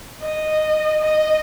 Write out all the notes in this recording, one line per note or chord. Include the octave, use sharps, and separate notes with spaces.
D#5
D#5